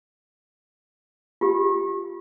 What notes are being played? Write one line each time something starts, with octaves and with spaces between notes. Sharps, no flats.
F4 G4